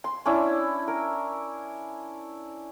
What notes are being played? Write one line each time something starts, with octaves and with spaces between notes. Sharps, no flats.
C6
C#4 D4 E4
A#4